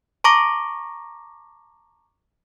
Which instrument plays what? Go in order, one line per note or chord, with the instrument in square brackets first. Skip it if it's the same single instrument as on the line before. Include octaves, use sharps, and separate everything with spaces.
[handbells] A5 A#5 C#6 D6 A#6